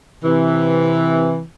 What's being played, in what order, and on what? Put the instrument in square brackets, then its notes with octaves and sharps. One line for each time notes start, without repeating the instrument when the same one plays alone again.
[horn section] C3 E3